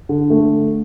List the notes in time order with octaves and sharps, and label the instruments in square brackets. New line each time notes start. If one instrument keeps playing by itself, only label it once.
[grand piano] D3
A3